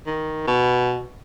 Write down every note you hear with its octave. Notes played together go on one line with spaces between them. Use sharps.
D#3
B2